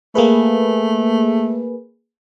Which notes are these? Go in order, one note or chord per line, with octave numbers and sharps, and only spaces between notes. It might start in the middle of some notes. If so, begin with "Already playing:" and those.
A3 A#3 G#4 B4